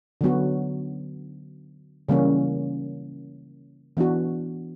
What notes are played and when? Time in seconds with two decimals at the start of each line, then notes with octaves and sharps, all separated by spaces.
0.21 D3 F#3 B3 F#4
2.09 C#3 E3 G3 A#3 C#4
3.97 E3 B3 D4 F#4